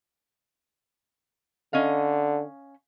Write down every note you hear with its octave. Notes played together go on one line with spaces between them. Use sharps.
D3 C#4 D#5 F5